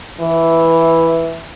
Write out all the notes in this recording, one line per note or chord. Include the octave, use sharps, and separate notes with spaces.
E3